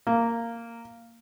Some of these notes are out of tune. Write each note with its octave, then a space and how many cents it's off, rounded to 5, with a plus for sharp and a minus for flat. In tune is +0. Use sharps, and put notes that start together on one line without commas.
A#3 -10